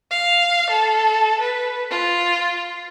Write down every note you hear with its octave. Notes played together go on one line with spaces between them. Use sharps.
F5
A4
B4
F4